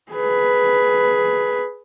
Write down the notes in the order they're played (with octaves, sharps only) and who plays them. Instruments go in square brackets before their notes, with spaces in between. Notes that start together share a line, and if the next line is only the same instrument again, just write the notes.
[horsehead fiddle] G#4 B4